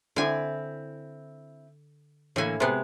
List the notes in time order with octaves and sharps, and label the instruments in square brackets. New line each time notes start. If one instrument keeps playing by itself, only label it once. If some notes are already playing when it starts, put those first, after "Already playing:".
[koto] D3 G#5 [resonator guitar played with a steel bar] C4 E4
[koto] A2 G#5 [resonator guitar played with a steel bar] D3 E3 A#3
[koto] C3 B3 [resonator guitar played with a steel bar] G#3